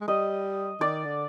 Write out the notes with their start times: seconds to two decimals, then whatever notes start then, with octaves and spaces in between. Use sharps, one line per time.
0.01 G#3
0.08 G3 D#5
0.80 D#3 D5
1.05 D3